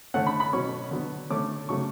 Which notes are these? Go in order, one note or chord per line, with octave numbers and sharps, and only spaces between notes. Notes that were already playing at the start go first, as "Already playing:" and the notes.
D3 A3 C#4 F#5
B5
B5
B2 F#3 C#4 C#6
D3 F#3 B3
D3 A3 C#4 D6
C#3 F#3 A3 C#6